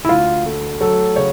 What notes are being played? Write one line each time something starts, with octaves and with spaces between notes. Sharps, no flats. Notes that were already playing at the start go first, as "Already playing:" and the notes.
E4
D2 F4
A3
F#3 A4
C#3 C#5